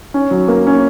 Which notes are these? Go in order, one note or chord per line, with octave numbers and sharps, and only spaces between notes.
C#4
F#3
A#3
C#4